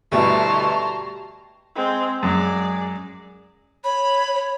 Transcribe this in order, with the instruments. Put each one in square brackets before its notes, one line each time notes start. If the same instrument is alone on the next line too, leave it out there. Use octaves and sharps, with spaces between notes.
[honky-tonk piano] D2 B2 E4 [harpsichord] G3 [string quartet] A5 A#5 C6 [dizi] C#6
[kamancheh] G#3 C4
[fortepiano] F#2 G#3 [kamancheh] G#4 D5
[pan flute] C#5 [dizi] B5
[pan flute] C#5